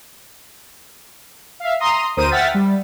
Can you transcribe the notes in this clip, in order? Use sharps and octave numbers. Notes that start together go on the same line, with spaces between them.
E5 F5
A#5 C6 D#6
D2 A#4 C5 D#6 D#7
E5 F#5 G5 F6 A6 B6
G3